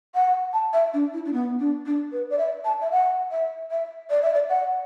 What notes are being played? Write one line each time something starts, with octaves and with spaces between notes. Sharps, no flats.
F#5
A5
E5
D4
E4
D4
B3
D4
D4
B4
D5
E5
A5
E5
F#5
E5
E5
D5
E5
D5
F#5